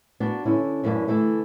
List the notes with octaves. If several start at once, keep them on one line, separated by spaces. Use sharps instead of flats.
A#3 B3 D4 F#4
D3 C#4 E4
F#2 E3 A#3 B3 D4
D3 E3 A3